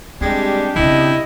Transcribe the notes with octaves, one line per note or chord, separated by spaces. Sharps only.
G3 G#3 C4 D4 G4
C#3 C4 E4 D#5